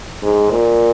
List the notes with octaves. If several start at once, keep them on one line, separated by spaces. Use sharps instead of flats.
G#2
A#2